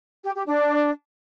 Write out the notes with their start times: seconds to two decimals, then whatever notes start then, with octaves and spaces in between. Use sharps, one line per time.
0.24 G4
0.36 G4
0.47 D4